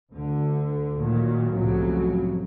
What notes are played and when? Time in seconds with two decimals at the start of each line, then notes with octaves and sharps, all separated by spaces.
0.11 D2 D3
0.99 A#2 D#3 F#3
1.53 C2 F2 A2 C#3 F#3